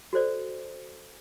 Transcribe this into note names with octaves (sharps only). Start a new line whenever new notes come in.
F#4 A4 C5 D5